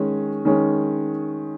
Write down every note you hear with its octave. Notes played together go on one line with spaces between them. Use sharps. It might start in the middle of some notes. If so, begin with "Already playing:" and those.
Already playing: D#3 G#3 C#4
D#3 G#3 C#4